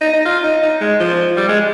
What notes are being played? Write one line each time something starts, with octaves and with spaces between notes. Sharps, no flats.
D#4
D#4
F4
D#4
D#4
G#3
F3
G3
G#3